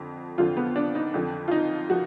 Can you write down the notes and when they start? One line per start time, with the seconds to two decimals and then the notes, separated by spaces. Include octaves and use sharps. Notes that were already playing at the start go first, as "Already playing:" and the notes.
Already playing: F2 D3 F3
0.38 F2 D3 F3 F4
0.57 B3
0.76 D4
0.95 D#4
1.14 F2 D3 F3
1.48 F4
1.51 D#4
1.90 F3 F#4